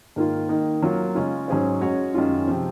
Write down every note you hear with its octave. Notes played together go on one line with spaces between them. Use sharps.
G#2 D#3 A#3 F4
D#3 A#3 D#4
F#3 A#3 F4
C#3 G#3 C#4 F4
G#2 F#3 C#4 G#4 C5
G#3 C#4 F#4 C#5
F#2 D#3 G#3 C#4 F4
C3 F3 C4